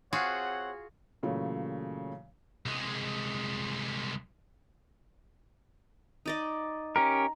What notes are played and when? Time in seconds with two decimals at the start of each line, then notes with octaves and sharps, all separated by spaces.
0.13 C4 F4 F#4 G#4 C#5 F#5
1.23 A#2 C#3 E3 F#3 A3
2.66 C2 G#3
6.26 D#4 D5 D#5
6.96 C#4 G4 A#4 A#5